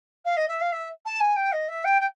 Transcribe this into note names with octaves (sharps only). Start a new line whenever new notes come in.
F5
D#5
E5
F5
E5
A5
G#5
G5
D#5
E5
G5
G5